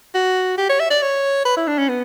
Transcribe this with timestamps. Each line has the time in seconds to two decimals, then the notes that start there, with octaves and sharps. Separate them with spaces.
0.15 F#4
0.58 G4
0.69 C#5
0.80 E5
0.90 D5
1.02 C#5
1.45 B4
1.57 E4
1.67 D4
1.78 C#4
1.89 B3